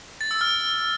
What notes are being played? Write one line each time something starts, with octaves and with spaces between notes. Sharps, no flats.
A6
E6
F6